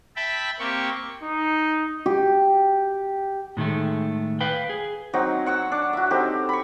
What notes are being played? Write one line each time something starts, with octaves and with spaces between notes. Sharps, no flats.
E5 G5 A5 B5
A#3 C4 G4 C#6
D#4
G4
A2 D#3 G#3 A3
B4 F5 G5
G#4
F#3 C4 D#4
F#5 C#6 E6
D4
F#4 E5
C4 D#4 G4 A4
B5 C#6